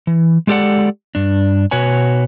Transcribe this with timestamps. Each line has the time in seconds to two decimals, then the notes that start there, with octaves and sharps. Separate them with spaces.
0.07 E3
0.47 G#3 A3 G4 A4 D5 F#5
1.15 G2 D4
1.71 B2 F#4 B4 C#5 G#5